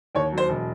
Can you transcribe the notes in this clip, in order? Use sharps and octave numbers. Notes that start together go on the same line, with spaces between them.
D#2 C#5
F#3 C5
E1